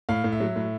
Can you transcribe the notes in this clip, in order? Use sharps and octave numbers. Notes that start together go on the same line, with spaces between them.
A2 F5
A2
E5
F#3
A2